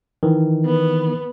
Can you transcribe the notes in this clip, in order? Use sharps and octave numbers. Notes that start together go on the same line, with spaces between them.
D#3 E3
B3